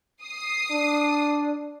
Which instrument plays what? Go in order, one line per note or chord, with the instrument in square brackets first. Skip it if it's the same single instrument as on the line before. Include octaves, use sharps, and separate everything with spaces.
[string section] D#6 C7
[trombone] D4